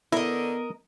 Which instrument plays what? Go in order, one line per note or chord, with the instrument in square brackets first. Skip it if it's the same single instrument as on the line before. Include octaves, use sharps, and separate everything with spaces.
[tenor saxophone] D3 [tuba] B3 [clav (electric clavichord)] E4 [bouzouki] A#4 D#5